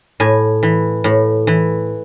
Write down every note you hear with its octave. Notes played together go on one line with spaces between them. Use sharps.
A2 G#5
E3
A2
E3